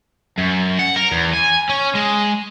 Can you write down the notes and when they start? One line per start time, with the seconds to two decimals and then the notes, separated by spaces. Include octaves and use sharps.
0.38 F#2
0.79 F#5
0.96 A#4
1.11 E2
1.33 G#5
1.69 C#4
1.95 G#3